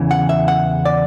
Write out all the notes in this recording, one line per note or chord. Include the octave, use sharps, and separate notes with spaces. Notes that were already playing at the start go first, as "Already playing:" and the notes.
Already playing: E2 C#3 E3
F#5
E5
F#5
D5